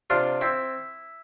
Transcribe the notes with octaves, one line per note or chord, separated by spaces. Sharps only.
C3 D4 F4
C4 E4